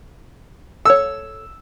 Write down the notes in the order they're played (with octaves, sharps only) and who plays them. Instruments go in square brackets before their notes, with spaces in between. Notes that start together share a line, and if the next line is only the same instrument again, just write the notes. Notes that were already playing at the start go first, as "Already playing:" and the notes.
[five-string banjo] A4 C#5 [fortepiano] E6